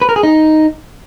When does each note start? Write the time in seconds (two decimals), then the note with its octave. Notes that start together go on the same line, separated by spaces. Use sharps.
0.02 B4
0.09 A#4
0.16 G#4
0.23 D#4